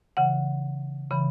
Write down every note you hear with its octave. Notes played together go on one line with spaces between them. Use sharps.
C#3 E3 F#5
C#3 E3 B5